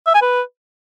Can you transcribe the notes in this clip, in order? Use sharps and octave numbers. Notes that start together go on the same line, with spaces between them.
E5
G#5
B4